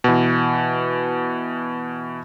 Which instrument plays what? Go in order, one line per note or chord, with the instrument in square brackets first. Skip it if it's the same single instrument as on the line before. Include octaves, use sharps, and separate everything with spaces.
[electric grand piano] B2 E3